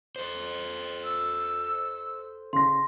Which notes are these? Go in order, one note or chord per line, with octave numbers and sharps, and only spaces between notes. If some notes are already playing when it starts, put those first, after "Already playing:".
A4 C5
E6
C#3 C6 A#6